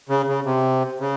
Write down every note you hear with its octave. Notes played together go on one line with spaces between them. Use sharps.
C#3
C#3
C3
C#3